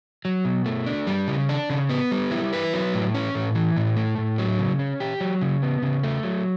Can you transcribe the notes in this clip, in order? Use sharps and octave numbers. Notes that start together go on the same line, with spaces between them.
F#3
B2
A3
D4
G3
C#3
D4
C#3
B3
G3
E4
B4
F#3
A2
C#4
A2
E3
A2
A3
A2
F#3
C#3
C#4
G4
F#3
C#3
B3
C#3
A3
F#3